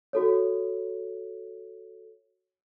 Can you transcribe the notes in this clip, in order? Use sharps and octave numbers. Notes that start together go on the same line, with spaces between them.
F#4 A4 C#5